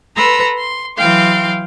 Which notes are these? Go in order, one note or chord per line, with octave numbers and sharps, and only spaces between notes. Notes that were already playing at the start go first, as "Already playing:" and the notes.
A4 B4 A#5 C6 E6
C6
E3 F#3 F5 G5 C6